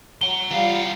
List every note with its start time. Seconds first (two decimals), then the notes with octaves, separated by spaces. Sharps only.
0.21 F#5 A#5 G7
0.51 E3 G3 F4 F5